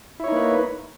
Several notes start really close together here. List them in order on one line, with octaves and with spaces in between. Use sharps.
E4 C#5 D#4 A#3 B4